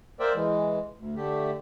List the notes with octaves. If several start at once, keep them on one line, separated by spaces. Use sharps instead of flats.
A#3 A#4 C5 D5 E5 G5
E3 G#3
D2
D3 A3 G4